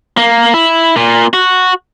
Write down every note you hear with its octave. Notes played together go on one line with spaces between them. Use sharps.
A#3
E4
A#2
F#4